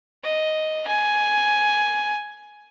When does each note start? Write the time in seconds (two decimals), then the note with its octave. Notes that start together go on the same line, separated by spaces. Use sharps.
0.24 D#5
0.87 G#5